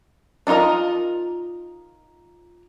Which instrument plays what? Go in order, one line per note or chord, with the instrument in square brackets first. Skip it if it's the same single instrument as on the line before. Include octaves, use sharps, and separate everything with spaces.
[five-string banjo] D4 D#4 F4 A#4 D#5